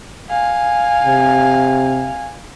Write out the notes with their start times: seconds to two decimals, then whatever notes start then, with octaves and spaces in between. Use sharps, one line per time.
0.29 F5 G#5
1.04 C3